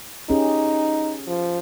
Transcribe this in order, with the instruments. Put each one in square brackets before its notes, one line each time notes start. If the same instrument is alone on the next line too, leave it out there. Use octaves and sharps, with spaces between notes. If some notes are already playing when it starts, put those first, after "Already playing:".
[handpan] C#4 G4 G#4 [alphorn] D#4
[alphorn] F3